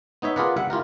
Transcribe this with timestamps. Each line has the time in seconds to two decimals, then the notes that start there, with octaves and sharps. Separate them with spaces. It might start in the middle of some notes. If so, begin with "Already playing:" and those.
0.22 B3 D#4 C#5 E5
0.36 F4 G#4 A#4 B4 D5 F#5
0.57 G3 E5 F#5
0.70 E4 F4 G4 A#4